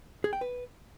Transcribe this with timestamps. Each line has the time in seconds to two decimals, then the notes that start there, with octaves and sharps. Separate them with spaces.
0.24 G#4
0.33 G5
0.41 B4